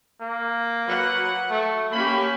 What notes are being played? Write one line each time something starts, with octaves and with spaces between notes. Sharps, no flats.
A#3
F#3 B4 F#5
A3
A#3 C#4 G4 B5